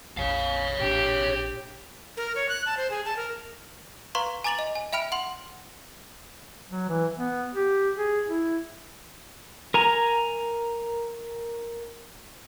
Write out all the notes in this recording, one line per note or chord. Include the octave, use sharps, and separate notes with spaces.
F1 A#1 F2 C#5 F5
A1 A#2 D4 G4
A#4
C#5
F#6
A5
C5
G#4
A5
A#4
B4 F5 A#5 C6 C#6
G#5 A#5 D6 A6 F7 F#7
D#5
G#5
E5 G5 B5 F6 D7
F#5 C6 F#7
F#3
E3
B3
G4
G#4
E4
A#4 G#5 A#5